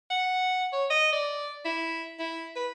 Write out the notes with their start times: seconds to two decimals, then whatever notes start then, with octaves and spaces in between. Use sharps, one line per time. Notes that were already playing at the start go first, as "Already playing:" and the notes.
0.10 F#5
0.73 C#5
0.90 D#5
1.12 D5
1.65 E4
2.19 E4
2.56 B4